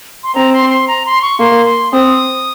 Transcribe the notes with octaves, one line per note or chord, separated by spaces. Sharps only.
C6
C4 A#5
C6
C6
A#5
C6
C#6
A#3 C6
C6
C4 D#6